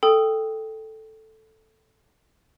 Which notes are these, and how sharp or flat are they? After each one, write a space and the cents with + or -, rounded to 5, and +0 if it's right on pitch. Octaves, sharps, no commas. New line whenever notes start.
A4 +0 G5 +0 D#6 +0